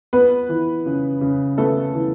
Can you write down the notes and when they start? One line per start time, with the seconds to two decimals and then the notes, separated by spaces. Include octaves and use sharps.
0.13 B3 B4
0.49 E3
0.86 C#3
1.21 C#3
1.58 A3 B3 A4
1.94 E3